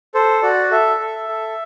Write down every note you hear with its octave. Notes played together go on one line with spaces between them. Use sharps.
A4 C5
F#4 D5
A4 E5
A4
A4